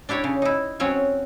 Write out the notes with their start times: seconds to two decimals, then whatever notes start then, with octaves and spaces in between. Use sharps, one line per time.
0.09 D4 E4 G4 C#5
0.24 C#3
0.42 D#4 E4
0.80 F#3 C4 C#4 C#5